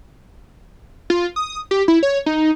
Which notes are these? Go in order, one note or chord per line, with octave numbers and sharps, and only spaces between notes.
F4
D#6
G4
E4
C#5
D#4